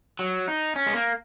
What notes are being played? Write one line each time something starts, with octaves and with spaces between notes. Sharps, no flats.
F#3
D#4
C#4
G#3
A#3